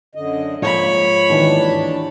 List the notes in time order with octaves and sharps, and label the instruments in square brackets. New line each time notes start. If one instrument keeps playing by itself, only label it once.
[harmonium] F#2 D3 D#5
[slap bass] G#2 F3 [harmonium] A#3 [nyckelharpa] C#5 B5
[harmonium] D#2 D4 A5 [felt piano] D#3 E3